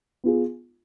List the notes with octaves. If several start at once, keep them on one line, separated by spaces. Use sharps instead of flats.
B3 F4 G#4